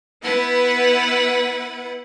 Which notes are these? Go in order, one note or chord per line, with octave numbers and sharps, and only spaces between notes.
B3 E4 B4 F#5